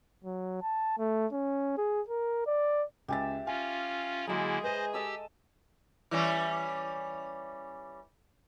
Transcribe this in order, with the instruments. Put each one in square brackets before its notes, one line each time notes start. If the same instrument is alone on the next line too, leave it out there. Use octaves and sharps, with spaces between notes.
[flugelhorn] F#3
A5
A3
C#4
G#4
A#4
D5
[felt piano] C#2 G#5 A6 [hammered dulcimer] G4 E5
[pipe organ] C#4 F4 [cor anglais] F5 [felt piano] G#5
[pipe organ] D3 A#3 E4 [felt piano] F#3 [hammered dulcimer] G#3 A#5 [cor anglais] G#4
[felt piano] B4 D#7 [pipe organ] C5 D#5
[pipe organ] G4 E6 [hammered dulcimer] A4 D#5 A5
[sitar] E3 G3 C#4